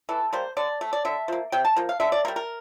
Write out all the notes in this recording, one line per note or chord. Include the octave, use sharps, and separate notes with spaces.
E3 A4
G3 A#3 C5
D3 D5
A3
D5
D3 E5
F3 A#3
C3 G5
A5
F3 A#3
F5
D3 E5
D5
A#3 A#4
G3
A#4